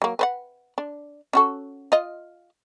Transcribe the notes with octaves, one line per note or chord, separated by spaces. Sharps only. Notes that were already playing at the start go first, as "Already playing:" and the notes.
F#3 A#3
B4 C5 F#5
D4
C#4 F#4 A4
F4 D#5